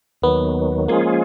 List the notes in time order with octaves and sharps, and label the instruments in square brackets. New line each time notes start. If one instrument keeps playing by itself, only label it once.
[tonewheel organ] D#2 D#3 F#3 [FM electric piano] B3
[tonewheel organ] F3 G#3 C#4 F4 G#4 [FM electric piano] A#3